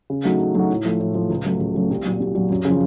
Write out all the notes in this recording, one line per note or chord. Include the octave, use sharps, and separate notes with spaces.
C#3
F#3 A3 D#4 F#4
C#3
F#3 A3 D#4 F#4
A2
F3 A3
A2
F3 A3
C#2
C#3 F#3 A3
C#2
C#3 F#3 A3
C2
A#2 F#3
C2
A#2 F#3
F#2
C#3
F3